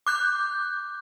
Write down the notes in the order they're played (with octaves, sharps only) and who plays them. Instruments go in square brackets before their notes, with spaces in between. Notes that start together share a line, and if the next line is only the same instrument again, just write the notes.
[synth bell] D6 F#6 G6